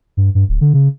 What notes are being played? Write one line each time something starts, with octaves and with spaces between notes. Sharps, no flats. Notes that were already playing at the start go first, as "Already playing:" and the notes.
G2
G2
D1
D3
C#3